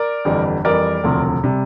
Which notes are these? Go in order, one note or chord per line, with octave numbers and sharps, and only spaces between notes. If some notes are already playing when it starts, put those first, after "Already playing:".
Already playing: A#4 D5
G1 F2 E3 G3
F2 E3 G3 A#4 D5
E1 D2 C3 F3
C3 G3